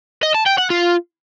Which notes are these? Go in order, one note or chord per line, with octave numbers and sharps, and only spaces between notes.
D#5
A5
G5
F#5
F4